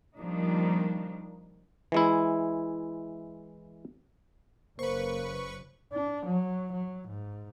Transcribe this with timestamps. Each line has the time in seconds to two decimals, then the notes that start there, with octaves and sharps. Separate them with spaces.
0.17 D#3 F3 G3 A#3 D4 D#4
1.92 E3 G#3 E4
4.79 F#1 C#3 A#3 B4 C5 C#6
5.93 D4
6.26 F#3
6.72 F#3
7.08 G#2